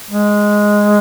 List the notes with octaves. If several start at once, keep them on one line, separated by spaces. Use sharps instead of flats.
G#3